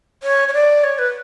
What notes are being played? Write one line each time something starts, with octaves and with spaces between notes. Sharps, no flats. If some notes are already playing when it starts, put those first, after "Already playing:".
C#5
C#5
D5
C#5
B4